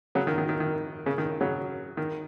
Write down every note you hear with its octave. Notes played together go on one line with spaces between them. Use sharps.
C#3 F#3
D#3
D#3
D#3
D#3
C#3
D#3
C#3 F#3
D#3